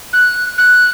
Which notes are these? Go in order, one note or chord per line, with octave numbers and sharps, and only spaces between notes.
F#6
F#6